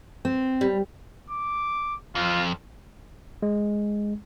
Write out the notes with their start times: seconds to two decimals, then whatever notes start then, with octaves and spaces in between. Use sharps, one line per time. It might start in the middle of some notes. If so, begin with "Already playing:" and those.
0.25 C4
0.61 G3
1.30 D6
2.15 F2 F4
3.43 G#3